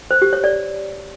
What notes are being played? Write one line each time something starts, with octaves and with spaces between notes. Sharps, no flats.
C5
G4
C#5
D5